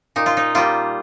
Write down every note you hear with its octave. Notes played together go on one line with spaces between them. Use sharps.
A#2 D#4
F4
D#4
G3 A#3 F4